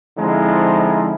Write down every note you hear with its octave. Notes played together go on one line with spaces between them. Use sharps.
D3 F3 G#3 C4 D#4 E4